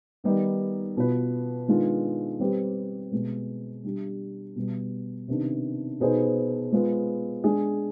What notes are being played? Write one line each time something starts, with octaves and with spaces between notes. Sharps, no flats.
D#3 G3 B3 D#4
B2 B3 F4 B4
D#3 G#3 B3 D4 F4
G3 C4 G4 B4
B2 G#3 B3
G3 D4 G4
B2 G3 B3
C3 D#3 B3 D4
B2 B3 D#4 G#4 C5
G#3 B3 F4
G#3 D4 G#4